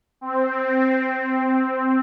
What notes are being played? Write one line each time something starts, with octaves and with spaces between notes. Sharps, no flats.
C4